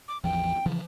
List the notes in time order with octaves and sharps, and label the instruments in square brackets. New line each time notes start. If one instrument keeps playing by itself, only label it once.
[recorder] D6
[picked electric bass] A1 E2 F3 [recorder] G5
[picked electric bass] C#3 E3 F3